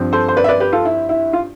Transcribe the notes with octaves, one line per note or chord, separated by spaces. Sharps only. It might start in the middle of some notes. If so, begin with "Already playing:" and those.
Already playing: G2 F3 C4
A4 C5
C5
B4 D5
E5
B4 D5
G4 B4
F4 A4
E4
E4
F4